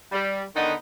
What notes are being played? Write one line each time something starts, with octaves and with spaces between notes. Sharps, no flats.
G3
D3 D#3 B3 D#4